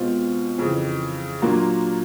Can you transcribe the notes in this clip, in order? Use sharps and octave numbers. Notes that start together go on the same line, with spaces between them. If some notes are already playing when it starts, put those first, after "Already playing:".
Already playing: B2 G#3 C4 F4
F2 C#3 E3
A#2 F#3 A#3 D4 F4